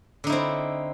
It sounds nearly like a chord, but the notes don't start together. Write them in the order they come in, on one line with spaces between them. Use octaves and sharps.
D3 D#4 E4 C4